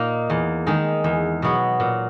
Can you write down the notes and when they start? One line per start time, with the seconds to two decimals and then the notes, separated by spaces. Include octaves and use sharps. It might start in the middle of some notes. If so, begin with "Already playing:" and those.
Already playing: A#2 A#3 D#4
0.30 E2
0.67 D#3 G#3 D#4
1.04 E2
1.42 B2 F#3 B3
1.80 A#2